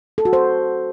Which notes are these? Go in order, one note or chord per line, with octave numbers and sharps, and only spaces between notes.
A4
F#4
C5